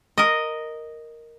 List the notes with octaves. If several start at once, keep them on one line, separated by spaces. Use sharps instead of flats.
A#4 D#5